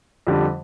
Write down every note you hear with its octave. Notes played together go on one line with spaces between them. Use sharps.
F2 D3 G3